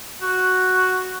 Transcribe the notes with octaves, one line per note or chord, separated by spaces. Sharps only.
F#4